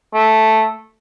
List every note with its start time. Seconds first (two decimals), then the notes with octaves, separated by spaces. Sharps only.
0.14 A3